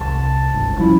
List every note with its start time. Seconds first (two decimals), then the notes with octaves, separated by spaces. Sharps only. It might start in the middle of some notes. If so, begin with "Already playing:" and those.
0.01 C2 A5
0.54 G1 C#2 G#2
0.79 F3 G3 C#4 E4